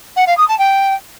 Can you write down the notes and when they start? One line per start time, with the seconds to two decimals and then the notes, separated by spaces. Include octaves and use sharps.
0.16 F#5
0.27 F5
0.37 D#6
0.48 A5
0.58 G5